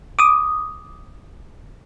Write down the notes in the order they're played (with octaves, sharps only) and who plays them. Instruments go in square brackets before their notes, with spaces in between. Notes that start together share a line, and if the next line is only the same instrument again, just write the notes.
[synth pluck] D6 D#6